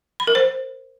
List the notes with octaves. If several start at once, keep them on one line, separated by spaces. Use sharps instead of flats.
B5
A#4
C5